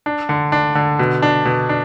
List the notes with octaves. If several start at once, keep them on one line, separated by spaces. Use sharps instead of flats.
D4
D3
D4
D3
B2
D4
B2
D4